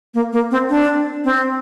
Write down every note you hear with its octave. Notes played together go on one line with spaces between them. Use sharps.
A#3
A#3
C4
D4
C4